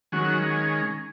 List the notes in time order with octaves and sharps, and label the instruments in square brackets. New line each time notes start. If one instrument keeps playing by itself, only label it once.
[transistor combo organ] D#3 F#3 G#3 C#4 F#4